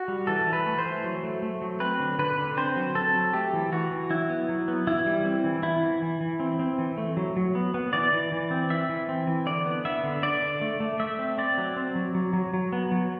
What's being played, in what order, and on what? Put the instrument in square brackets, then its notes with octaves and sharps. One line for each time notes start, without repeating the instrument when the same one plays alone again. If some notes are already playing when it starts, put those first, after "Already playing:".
Already playing: [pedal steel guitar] F#4
G3
E3 A4
E3
B4
A3
C5
E3
F#3
A3
A3
F#3
C4 B4
D3
D3 B4
D3
C4 C5
F#3
C4 A4
F#3
A3 G4
E3
E3 F#4
E3
F#3 E4
B3
F#3
B3
E3 E4
G3
C4
E3
B3 E4
E3
E3
E3
C4
C4
E3
A3
F#3
F#3
B3
B3
E3 D5
E3
E3
C4
E3 E5
E3
C4
E3
D3 D5
B3
B3 E5
D3
D3 D5
D3
A3
A3
A3 E5
C4
C4 D5
F#3
C4
F#3
F#3
F#3
F#3
B3
F#3